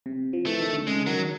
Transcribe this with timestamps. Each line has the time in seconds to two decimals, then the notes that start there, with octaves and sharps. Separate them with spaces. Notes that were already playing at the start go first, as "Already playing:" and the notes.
0.06 C3
0.33 F3
0.46 E3 A3
0.60 D#3
0.73 D3
0.87 C#3 G#3
1.06 D#3 F#3